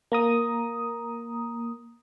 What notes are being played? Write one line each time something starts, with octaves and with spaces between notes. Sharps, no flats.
A#3 A#5 D#6